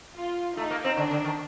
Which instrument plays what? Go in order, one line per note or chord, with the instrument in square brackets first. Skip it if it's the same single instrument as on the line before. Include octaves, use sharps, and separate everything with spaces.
[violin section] F4
[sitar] A3 [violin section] D#4
[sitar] A#3
C4
[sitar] D3 [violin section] D4
[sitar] D3
D#3